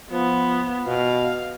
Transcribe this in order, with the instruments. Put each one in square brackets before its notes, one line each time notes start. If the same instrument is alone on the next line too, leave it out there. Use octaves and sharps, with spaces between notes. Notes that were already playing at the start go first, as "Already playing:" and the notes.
[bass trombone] F3 [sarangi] B3
[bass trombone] B2 [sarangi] F5